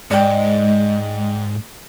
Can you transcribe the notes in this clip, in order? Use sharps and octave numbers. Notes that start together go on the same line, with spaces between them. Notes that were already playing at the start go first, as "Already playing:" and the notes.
G#2 G#3 D5 G5